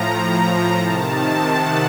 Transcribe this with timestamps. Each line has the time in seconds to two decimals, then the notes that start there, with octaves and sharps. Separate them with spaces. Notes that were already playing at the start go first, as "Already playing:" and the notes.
Already playing: A2 F3 A#5
0.79 C3 D#3 A5
1.54 F#5